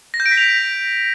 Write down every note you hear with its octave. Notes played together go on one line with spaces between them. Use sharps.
A#6
G6
D7
B6
F7